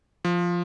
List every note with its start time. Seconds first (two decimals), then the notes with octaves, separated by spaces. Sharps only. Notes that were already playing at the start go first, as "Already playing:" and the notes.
0.25 F3